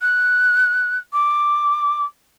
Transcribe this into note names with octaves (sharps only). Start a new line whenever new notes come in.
F#6
D6